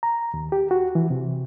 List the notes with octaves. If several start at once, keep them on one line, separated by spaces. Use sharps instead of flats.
A#5
D#2
G4
F#4
E3
C3